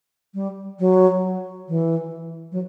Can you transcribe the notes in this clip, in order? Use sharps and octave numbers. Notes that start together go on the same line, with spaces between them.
G3
F#3
E3
F#3